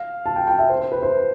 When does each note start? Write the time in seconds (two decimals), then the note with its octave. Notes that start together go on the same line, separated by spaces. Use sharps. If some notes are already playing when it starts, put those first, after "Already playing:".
Already playing: F5
0.26 A5
0.36 G5
0.47 G5
0.59 E5
0.69 C5
0.80 C5
0.92 B4
1.03 C5